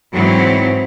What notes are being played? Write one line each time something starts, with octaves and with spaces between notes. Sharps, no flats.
G#2 E3 F#3 C4